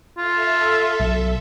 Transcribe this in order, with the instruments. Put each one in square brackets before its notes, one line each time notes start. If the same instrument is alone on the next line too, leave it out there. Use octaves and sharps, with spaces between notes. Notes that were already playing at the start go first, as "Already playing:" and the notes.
[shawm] F4 [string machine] A4 E5
[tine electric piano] B1